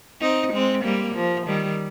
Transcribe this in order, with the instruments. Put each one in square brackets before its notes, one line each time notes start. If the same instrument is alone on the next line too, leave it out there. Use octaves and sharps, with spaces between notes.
[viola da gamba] C4 D#4
G#3 C4
G3 A#3
F3
D#3 G3